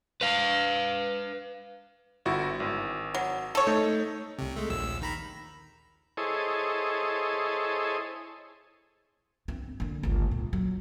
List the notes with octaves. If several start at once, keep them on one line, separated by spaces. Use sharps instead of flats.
B4 F5
G1 E4 F#4
G#1
F#3
A4 C#5
A3 D#4
C2 C3
G#3 A3
A#1 D#2 E6
D#3 A#5 B5
E4 G#4 A4 C5 C#5 D#5
G1 C4
D3 A#3
G1 C#2
A#2
F#3